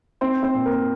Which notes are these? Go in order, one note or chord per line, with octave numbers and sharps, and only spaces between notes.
C4 D#4 C5
C4 C5
A#2
A#3 A#4